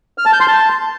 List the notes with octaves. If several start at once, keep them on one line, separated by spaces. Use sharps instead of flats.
F6
A5
G6
C6
A5